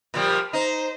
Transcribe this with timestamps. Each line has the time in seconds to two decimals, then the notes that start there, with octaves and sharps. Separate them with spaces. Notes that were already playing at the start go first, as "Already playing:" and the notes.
0.14 A#2 F3 G3
0.53 D#4 C5